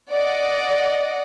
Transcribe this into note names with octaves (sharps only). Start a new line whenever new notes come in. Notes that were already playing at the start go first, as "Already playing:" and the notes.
D5 D#5 F#5